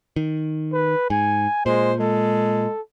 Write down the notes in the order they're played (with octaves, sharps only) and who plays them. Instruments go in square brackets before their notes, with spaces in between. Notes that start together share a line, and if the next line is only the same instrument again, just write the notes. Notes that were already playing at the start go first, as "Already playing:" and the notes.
[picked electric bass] D#3
[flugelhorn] B4
[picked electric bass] G#2 [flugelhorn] G#5
[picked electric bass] A#2 [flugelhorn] G#3 [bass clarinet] C5
[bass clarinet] G#3 [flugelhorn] A4